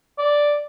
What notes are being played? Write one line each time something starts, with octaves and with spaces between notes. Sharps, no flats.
D5